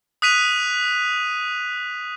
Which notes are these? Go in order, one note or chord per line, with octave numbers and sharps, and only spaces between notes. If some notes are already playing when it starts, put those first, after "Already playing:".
D#6 F#6 B6 D#7 F7